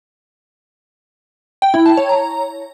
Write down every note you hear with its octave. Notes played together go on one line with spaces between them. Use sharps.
G5
E4
A5
C#5
A#5